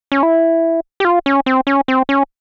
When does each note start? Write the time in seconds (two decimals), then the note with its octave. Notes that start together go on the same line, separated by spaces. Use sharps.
0.12 C#4
0.23 E4
1.00 G4
1.05 F4
1.26 C#4
1.46 C4
1.67 C#4
1.88 C4
2.09 C#4